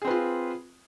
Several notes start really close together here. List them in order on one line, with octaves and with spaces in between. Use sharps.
G#4 C4 B4 F4